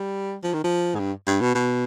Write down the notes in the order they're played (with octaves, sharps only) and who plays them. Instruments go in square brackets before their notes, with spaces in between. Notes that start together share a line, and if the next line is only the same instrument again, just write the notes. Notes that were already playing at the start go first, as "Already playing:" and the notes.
Already playing: [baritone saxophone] G3
F3
D#3
F3
G#2
G2
G2
B2
B2